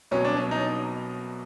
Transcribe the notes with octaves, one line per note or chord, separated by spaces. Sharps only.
C2 B2 F#3 C#4
D4
C#4
D#4